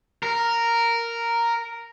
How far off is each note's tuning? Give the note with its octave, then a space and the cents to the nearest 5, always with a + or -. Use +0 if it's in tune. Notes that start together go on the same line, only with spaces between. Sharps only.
A#4 -5